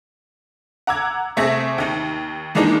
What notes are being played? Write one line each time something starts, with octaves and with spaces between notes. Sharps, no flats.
F#5 A#5 D6 E6 G#6
C3 A3 C4 G#4 E5 A#6
D#2 D#4
D#3 E3 G#3 A#3 D4 D#4